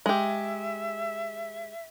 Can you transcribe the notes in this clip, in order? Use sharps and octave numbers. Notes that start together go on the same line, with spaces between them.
G#3 G4 E5